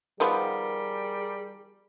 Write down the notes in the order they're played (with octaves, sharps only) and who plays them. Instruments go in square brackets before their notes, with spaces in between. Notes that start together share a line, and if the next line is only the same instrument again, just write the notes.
[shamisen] D#3 F3 B3 [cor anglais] G3 [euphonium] G#4 [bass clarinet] A#4